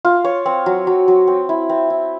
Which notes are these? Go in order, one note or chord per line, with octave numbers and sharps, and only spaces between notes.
F4
C#5
C4
F#3
F#3
F#3
C4
E4
C4
E4